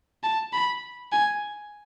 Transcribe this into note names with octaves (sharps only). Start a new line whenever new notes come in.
A5
B5
G#5